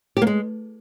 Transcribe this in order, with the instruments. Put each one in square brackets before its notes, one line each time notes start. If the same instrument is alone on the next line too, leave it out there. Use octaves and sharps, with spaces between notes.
[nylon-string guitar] G4
A#3
G#3